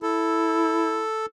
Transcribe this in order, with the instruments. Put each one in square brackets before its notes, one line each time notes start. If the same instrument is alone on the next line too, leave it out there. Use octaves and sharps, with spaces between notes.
[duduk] E4 [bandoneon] A4